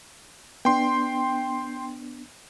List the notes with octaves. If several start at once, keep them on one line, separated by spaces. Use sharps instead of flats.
B3 D4 G5 C6